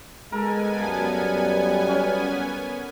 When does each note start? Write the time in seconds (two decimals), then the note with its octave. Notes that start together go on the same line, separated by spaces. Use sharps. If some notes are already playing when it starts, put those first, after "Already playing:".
0.32 G#3 B3 A4 A#4 G#5
0.80 F#2 G3 F5
1.88 C#4